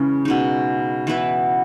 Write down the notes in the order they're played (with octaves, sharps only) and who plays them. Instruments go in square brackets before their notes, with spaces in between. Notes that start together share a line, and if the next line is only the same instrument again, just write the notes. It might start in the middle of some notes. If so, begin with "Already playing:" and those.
Already playing: [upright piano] C#3 [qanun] E3 G#3 C#4
[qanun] B2 G#3 D#4
E3 B3 E4 B4